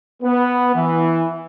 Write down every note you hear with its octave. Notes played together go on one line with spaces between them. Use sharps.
B3
E3